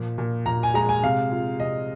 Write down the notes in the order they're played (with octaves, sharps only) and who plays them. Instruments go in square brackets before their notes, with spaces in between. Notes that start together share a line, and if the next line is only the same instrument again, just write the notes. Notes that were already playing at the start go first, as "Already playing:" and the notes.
Already playing: [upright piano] A#2 F3
A#2
A#2 A#5
G#5
G#3 A#5
G#5
C3 F5
F4
C3 D#5